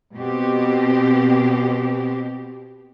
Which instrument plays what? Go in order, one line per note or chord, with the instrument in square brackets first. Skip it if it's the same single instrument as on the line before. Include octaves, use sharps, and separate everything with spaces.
[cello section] B2 C4 G4